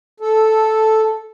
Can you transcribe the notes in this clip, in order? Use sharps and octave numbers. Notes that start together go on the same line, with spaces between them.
A4